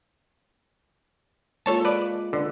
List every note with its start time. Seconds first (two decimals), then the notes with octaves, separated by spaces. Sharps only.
1.66 G#3 A#3 F4 A4 C#5 A5
1.85 B4 D5
2.33 D3 B4